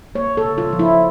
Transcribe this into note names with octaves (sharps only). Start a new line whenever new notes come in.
A#3 C#5
A4
C#3
F4
F3
E4